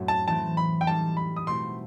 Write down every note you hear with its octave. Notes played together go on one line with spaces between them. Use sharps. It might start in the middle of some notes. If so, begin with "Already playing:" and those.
Already playing: F#2 A2 F#3 A3 C4
A5
E3 A3 C4 A5
B5
G5
A2 G3 D#4 A5
B5
D#6
B2 A3 C4 E4 C6